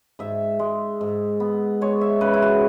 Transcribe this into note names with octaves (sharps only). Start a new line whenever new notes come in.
G#2 E5
G#3
G#2
B3
G#3 C#5
E5
C#3 B4
E4
F#4